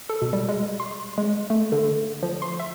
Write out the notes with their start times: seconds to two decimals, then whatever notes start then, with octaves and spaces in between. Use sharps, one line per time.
0.09 A4
0.22 B2
0.33 G3
0.49 G#3
0.80 C6
1.18 G#3
1.50 A3
1.72 D3
2.23 F3
2.42 C6
2.60 E5